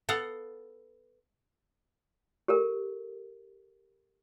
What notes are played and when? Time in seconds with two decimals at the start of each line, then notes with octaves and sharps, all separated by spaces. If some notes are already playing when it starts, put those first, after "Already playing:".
0.09 B3 A4 F5 F#5
2.48 G4 A4 A#4